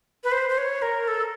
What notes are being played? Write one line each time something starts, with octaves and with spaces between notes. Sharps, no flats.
B4
C5
C5
C#5
A#4
A4